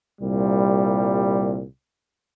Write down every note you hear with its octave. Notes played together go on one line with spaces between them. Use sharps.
C2 A#2 G3